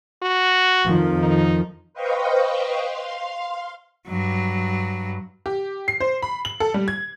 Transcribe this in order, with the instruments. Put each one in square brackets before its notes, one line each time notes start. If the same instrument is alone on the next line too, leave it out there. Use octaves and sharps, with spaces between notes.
[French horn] F#4
[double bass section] F2 D#3 F3
[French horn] D#4
[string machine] B4 C5 D#5 F5 G5 C#6
F5 C6
[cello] G2 F#3
[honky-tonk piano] G4
C7
C5
B5
F#7
A4
G3
G#6